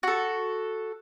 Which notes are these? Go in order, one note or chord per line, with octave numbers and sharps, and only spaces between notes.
F#4 A4